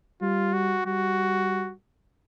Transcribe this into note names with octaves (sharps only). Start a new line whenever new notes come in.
G3 F4
F#4
G3 F#4